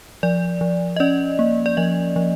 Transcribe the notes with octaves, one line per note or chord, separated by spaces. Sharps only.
F3 D5
F3
D#5
C#4 D5
A#3
D5
F3 D#5
F3